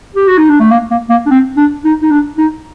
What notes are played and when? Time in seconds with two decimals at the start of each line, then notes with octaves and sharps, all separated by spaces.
0.15 G4
0.27 F#4
0.38 D#4
0.50 D4
0.60 A3
0.71 A#3
0.91 A#3
1.10 A#3
1.26 D4
1.30 C4
1.57 D4
1.85 D#4
2.02 D#4
2.11 D4
2.38 D#4